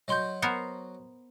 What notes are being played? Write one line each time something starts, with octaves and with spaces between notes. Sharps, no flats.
F#3 F#4 D#5 C6 G6
B3 A#4 C5 C#7